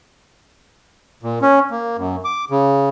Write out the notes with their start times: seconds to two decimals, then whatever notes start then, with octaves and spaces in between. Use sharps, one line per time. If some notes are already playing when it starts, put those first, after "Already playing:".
1.23 A#2
1.42 C#4
1.71 A#3
1.97 F#2
2.25 D6
2.51 C#3